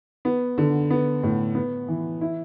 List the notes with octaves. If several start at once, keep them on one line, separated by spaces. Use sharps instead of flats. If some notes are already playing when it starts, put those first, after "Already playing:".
B3
D3
B3
A2
B3
E3
E4